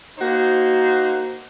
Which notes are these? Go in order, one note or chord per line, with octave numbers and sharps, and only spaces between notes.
A#3 D#4 F#4 C5